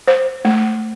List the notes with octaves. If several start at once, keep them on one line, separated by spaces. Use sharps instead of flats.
C5
A3